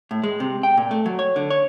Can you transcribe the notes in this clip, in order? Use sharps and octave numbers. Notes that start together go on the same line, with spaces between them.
A2
G#3
C3
G5
A#2
A3
F#3
C#5
D3
C#5